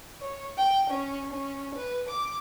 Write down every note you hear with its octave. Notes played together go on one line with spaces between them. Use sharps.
C#5
G5
C#4
C#4
B4
D6